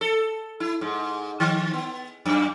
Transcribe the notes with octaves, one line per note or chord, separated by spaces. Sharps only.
A4
E4
G#2
D#3
B3
F#2